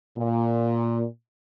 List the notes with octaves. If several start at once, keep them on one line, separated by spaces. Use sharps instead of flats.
A#2